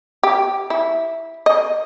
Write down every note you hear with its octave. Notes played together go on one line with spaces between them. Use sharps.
G4
E4
D#5